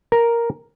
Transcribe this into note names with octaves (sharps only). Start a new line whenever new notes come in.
A#4